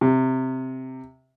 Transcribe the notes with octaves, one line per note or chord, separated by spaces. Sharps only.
C3